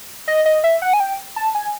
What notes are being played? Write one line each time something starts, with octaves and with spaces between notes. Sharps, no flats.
D#5
D#5
E5
F#5
G#5
G5
A5
G#5